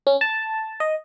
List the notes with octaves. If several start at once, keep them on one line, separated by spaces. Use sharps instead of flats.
C#4
A5
D#5